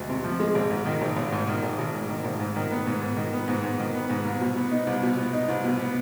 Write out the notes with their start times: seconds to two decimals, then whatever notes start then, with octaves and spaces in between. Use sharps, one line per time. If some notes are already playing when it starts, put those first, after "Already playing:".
Already playing: D2 G#3
0.09 C3
0.24 F3
0.40 G#3
0.55 G#1
0.71 G#2
0.86 D#3
1.02 G#1
1.17 G#1
1.32 G#2
1.48 D#3
1.63 G#1
1.79 G#1
1.94 G#2
2.09 D#3
2.25 G#1
2.40 G#2
2.56 D#3
2.71 B3
2.86 G#2
3.01 G#2
3.17 D#3
3.33 B3
3.48 G#2
3.64 G#2
3.79 D#3
3.94 B3
4.10 G#2
4.25 C2
4.41 B2
4.56 B3
4.71 D#4
4.87 C2
5.03 B2
5.17 B3
5.33 D#4
5.48 C2
5.64 B2
5.79 B3